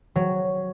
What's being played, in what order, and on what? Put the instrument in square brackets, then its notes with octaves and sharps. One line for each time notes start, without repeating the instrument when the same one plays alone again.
[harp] F#3